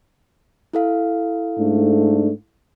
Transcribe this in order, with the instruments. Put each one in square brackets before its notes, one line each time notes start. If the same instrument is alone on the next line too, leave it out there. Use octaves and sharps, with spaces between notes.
[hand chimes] E4 A4 F5
[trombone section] G#2 A3 D4